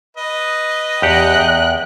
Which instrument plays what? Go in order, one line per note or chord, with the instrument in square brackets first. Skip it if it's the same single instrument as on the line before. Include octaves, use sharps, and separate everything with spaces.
[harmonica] B4 D#5
[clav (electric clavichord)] E2 G4 F#5 [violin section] G5 F#6
[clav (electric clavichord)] E2